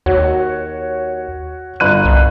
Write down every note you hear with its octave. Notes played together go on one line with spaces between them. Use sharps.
D#2 F#4 C#5
G1 F#6 D#7
C2